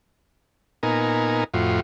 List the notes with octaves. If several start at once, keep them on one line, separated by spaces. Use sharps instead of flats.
A#2 B3 D#4 A#4 G#5
F2 A2 F4 F#4